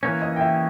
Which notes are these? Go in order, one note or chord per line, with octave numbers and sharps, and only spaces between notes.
E3 A#3 C#4 C#5
D#5
G5
E5